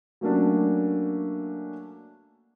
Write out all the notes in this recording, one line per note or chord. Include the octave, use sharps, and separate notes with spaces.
F#3 A3 A#3 C#4 D4